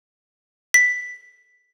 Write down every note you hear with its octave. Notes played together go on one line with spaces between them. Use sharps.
B6